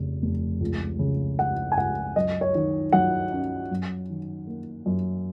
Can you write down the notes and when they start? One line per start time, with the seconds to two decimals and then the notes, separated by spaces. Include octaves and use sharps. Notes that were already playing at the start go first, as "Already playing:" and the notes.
Already playing: F1 F2 C#3
0.22 F1
0.60 C#2
0.99 C#3
1.39 G#3 F#5
1.72 G#5
1.77 C#2 F#5
2.16 F#2 D#5
2.41 C#5
2.55 D#3
2.93 F#3 F#5
3.32 C#4
3.71 F#2
4.10 D#3
4.47 A#3
4.86 F#2